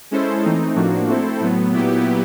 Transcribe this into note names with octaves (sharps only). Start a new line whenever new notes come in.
G#3 C#4 E4 A4 C5
E3 A3 C4 D#4
A2 F3 A#3 D4 F#4
A3 C4 E4 A4 C5
A2 F#3 B3
A#2 F#3 B3 E4 G4